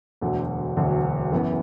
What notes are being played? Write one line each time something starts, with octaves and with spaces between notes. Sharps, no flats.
E1 D2 D3 F#3
E1 D2 D3 F#3
F#1 F#2 E3 B3